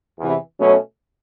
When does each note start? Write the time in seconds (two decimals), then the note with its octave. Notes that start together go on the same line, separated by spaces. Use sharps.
0.18 E2 C3 E3
0.59 B2 F#3 A3 C#4